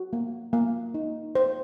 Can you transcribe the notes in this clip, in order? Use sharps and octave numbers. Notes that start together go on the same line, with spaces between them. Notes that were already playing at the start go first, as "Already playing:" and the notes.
Already playing: F#4
A#3
A#3
D#4
C5